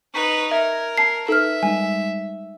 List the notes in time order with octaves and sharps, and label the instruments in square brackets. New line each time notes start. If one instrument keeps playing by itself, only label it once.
[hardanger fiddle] D#4 B4 [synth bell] C#6 B6
[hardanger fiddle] A#4 [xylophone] E5 [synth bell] G#6 A#6
[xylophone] A5 C7
[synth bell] D#4 B4 [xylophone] A4 F6 [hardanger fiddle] E5
[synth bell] G3 G#3 D#4 [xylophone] G#5